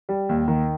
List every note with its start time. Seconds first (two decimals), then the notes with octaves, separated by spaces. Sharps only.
0.09 G3
0.29 D#2
0.48 D#3